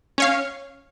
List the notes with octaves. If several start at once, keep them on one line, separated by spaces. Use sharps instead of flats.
C#4 C#5 F5